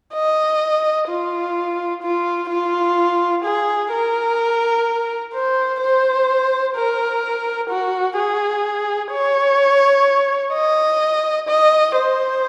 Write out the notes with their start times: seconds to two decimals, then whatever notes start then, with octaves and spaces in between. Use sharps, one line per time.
0.14 D#5
1.09 F4
2.02 F4
2.50 F4
3.44 G#4
3.92 A#4
5.34 C5
5.81 C5
6.76 A#4
7.70 F#4
8.17 G#4
9.12 C#5
10.54 D#5
11.48 D#5
11.95 C5